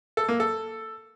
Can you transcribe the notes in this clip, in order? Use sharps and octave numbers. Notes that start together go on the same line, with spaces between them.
A4
A#3
A4